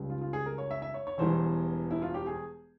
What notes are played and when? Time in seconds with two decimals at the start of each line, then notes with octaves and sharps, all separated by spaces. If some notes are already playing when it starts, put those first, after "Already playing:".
Already playing: C#2 C#3 G3
0.10 F4
0.21 F4
0.33 G#4
0.46 A#4
0.58 C#5
0.71 E5
0.82 E5
0.94 C#5
1.07 C#5
1.18 E1 E2 E3 G3 C5
1.91 E4
2.02 F4
2.14 G4
2.27 G#4